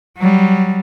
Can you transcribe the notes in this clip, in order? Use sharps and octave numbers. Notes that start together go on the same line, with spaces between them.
F#3 G3